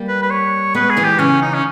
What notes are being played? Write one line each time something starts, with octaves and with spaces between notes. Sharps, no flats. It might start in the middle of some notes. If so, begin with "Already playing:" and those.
Already playing: G3 A#3
B4
B4
C#5
G#3 B3 B4
G#4
E3 G#3
G4
C#3 E3 C#4
D#4
C#4